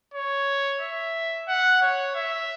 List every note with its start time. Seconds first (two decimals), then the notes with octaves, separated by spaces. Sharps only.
0.14 C#5
0.81 E5
1.48 F#5
1.82 C#5
2.16 E5